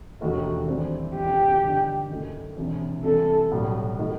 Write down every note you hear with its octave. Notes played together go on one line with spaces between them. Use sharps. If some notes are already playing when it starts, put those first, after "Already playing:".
E1 D#2 D#3 A3 F#4
G2 E3 A3 C4
E1 E2 D#3 G4
G1 G2 D#3
F#1 F#2 D#3 A3
E1 E2 C3 E3
C2 C3 E3 A4
B1 A2 G3
D#3 A3 D#4